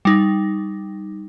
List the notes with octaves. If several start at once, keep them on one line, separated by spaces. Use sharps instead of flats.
G3 D#4